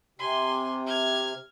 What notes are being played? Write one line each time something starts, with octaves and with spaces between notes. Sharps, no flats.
C3 G#5 C6
F6 G#6